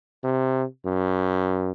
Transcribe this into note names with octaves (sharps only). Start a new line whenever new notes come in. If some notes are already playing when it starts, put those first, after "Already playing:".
C3
F#2